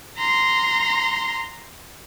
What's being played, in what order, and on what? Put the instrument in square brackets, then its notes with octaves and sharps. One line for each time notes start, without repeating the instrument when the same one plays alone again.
[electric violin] A#5 C6